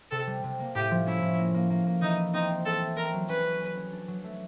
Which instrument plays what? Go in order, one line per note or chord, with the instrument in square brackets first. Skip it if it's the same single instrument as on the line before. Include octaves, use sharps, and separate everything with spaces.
[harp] C3 [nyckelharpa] A4
[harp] G3
C3
A#3
[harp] A2 [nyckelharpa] G4
[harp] F3
[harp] C#4 [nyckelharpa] E4
[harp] A2
A#3
A#3
A#3
A#3
[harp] E3 [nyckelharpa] D#4
[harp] E4
[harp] C4 [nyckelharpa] D#4
[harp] C4
[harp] C4 [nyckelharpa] A4
[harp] A3
[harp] C4 [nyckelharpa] A#4
[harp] F#3
[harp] C#4 [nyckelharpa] B4
[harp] C#4
C#4
C#4
D4
F#3
A3